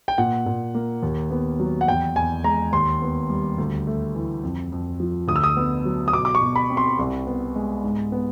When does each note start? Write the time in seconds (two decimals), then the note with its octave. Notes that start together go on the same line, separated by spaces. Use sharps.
0.08 G5
0.18 A#2 F#5
0.46 A#2
0.75 A#3
1.03 D#2
1.31 B3
1.60 F#3
1.81 F#5
1.88 E2 G5
2.16 E2 G#5
2.44 G#3 A#5
2.73 D#2 C6
3.02 B3
3.30 G3
3.58 D2
3.87 A3
4.15 E3
4.43 F2
4.72 F2
5.00 F3
5.28 D2 D#6
5.36 E6
5.44 D#6
5.57 B3
5.85 F#3
6.08 D#6
6.13 B2 D6
6.25 D6
6.35 C#6
6.42 B2
6.56 B5
6.70 C4
6.77 C6
6.99 C2
7.27 B3
7.56 G#3
7.84 G#2
8.12 B3